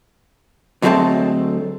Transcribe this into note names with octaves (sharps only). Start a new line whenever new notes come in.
D2 F#3 G#3 A3 C4 A5